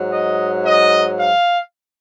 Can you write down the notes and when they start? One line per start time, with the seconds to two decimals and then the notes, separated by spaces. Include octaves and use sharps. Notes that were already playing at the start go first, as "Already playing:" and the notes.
Already playing: G#2 F#3
0.11 D#5
0.65 D#5
1.19 F5